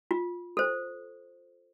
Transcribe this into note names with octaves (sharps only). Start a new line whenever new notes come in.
F4
A4 C5